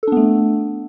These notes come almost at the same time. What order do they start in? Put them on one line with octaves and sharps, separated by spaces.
A4 D4 B3 A3